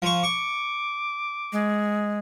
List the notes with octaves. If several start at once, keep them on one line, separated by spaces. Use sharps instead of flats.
F3 C#6
C#6 D6
G#3